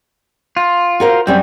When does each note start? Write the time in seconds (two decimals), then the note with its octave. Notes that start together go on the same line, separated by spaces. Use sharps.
0.57 F4
1.00 F#4 A#4 C5
1.27 F#2 G3 C4 C#4